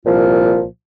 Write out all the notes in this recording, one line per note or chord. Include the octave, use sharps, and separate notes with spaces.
C2 A#2 F3 F4